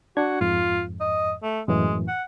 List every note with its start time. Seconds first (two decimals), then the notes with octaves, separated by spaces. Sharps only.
0.17 D4 F#4 G#6
0.41 F2 G#2 F4
1.00 D#5
1.43 A3
1.68 F#2 A2 E3 G#3
2.08 F#5